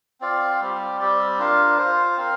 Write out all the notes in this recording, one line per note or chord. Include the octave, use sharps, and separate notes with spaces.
C4 F4 D5 F5
G3 C4 G4
G3 C4 G4 D5
D4 F4 A#4 F5
F4 C5 F5
C4 A#4 F5